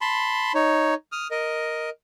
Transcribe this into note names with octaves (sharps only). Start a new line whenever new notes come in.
A5 B5 C6
D#4 C#5
D#6 F6
A#4 D#5